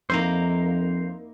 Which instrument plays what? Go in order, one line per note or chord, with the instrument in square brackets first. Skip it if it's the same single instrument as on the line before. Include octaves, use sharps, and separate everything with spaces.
[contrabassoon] F2 [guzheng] A#3 D#4 E4 [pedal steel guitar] C5 A#5